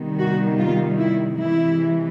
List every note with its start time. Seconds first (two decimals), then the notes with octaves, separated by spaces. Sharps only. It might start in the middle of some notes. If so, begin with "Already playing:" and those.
Already playing: C3 D#3 G3 B3
0.19 F#4
0.58 F4
0.97 E4
1.37 C3 E3 G#3 E4